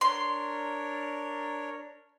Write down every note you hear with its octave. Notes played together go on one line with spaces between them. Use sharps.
D4 A#4 C#5 C6